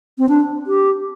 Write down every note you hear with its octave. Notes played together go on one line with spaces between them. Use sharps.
C4
D4
G4